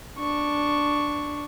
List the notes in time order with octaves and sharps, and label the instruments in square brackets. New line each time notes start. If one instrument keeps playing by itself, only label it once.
[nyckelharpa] D4 C#6